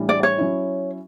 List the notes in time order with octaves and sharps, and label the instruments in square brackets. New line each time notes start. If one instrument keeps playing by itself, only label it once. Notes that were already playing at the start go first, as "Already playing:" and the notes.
Already playing: [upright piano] A2 E3 G3 D4
[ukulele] D5
C#5
[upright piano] F#3 C#4 E4